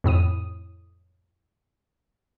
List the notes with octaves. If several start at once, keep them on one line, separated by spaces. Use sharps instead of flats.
F2 A2 D#6 D#7